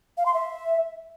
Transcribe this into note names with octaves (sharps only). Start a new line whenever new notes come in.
F5
C6
E5